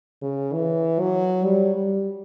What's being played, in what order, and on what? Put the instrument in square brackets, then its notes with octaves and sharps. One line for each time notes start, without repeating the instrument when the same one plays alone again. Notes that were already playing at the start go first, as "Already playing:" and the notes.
[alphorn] C#3
E3
F#3
G3
G3